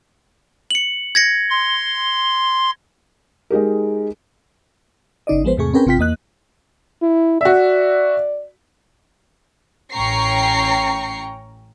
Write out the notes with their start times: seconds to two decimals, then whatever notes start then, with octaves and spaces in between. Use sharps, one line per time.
0.71 C#7 F#7
1.15 G#6 A#6 C#7
1.50 C6
3.50 G#3 D#4 G4 A#4
5.27 G1 C#3 D#4 D5 D#5
5.44 A1 F3 G#3 B3 B4 C5
5.57 E2 G#2 C3 A3 G#4 C#6
5.74 C4 C#4 G#4 A#4 B4 G5
5.86 G#1 C3 C4 F4 G5 B6
5.98 E2 A#3 D#5 F#6
7.02 E4
7.41 F#4 D5 E5
9.93 A1 C#4 G5 A#5 C#6 C7